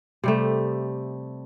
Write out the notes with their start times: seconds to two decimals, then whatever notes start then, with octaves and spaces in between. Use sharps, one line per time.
0.24 C3 G3 A3